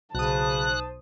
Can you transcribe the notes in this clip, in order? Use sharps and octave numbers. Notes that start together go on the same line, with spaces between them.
B1 C#3 C5 A5 D#6 F#6